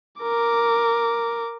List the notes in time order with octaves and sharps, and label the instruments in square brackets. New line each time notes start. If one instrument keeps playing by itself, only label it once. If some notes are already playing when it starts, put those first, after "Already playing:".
[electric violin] A#4 D6